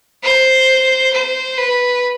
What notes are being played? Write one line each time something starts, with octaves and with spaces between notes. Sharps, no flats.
C5
C5
B4